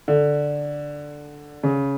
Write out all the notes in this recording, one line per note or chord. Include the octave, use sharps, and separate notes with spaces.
D3
C#3